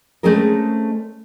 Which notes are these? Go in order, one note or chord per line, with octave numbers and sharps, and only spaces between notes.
G#3 A3 C4 C#4 G#4 A#4